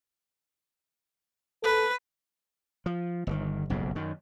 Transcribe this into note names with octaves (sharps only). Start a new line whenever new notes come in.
A4 B4
F3
G1 A#2 D#3
F#1 B1 F2 G#2
F#2 D#3